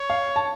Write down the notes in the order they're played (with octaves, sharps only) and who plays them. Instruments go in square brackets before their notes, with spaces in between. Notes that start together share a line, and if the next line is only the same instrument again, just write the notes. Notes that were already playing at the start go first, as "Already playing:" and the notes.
Already playing: [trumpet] C#5
[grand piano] F5
A5